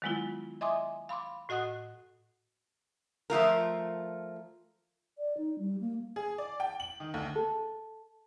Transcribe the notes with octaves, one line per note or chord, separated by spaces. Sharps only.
D#3 F#3 G#3 B3 E4 F4
D#5 E5 G#5 C6 D6 D#6
F5 B5 C6 D6
A2 F#4 D#5 F#5 D#6 F#6
F3 A3 F4 A#4
D5
D#4
G3
A#3
G#4
D5
G5
F#7
D#3
D2
A4